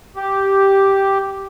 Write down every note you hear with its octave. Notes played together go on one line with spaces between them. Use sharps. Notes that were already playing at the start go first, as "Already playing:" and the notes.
G4